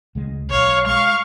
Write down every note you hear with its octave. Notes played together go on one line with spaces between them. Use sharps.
D2 C#3 G#3
B1 C#5 F5
G#3 F5 C#6